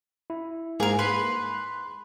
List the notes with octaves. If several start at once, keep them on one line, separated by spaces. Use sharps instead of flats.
E4
G#2 A#3 G#4 A#4
B4 C6 C7